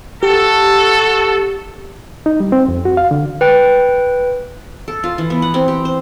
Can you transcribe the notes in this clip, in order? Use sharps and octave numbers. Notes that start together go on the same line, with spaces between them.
F#4 G4 A4
D#4
G3
C4
F2
F#4
F5
D3
B4 G5
A4
F4
E3
B3
F#5
C4
G4
C5